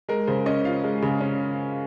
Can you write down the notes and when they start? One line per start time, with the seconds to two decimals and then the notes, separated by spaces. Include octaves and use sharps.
0.09 G#3 A#4
0.27 C#3 C5
0.46 C#4 D#5
0.65 F4 F5
0.84 G#3
1.02 C#3
1.21 C#4